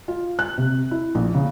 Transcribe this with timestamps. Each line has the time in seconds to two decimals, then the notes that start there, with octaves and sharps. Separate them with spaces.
0.08 F4
0.39 F#6
0.58 C3
0.91 E4
1.15 A#1
1.35 C#3